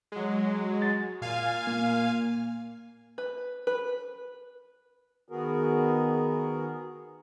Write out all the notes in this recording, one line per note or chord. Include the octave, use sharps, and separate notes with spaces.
F#3 G#3
A6
A#2 F5 G#5
A#3
B4
B4
D#3 B3 F#4 G#4 A#4